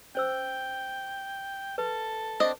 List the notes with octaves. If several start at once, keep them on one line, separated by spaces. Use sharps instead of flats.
C#4 C5 G5 E6
A4 B4
C4 D4 D#5